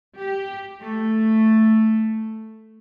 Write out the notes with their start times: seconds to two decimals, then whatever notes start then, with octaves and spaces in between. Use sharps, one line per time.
0.16 G4
0.80 A3